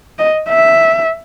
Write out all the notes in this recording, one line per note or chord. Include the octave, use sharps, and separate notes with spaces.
D#5
E5